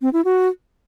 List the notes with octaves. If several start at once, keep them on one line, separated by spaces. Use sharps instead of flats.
C4
E4
F#4